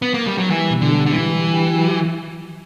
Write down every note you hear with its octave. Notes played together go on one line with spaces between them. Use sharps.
B3
A#3
G3
F#3
E3 G3
B2
D3
G3
D3
E3 G3
G3
G4
F#3